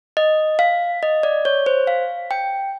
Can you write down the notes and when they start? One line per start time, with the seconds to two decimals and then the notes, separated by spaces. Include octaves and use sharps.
0.17 D#5
0.59 F5
1.03 D#5
1.23 D5
1.45 C#5
1.66 C5
1.87 F5
2.31 G5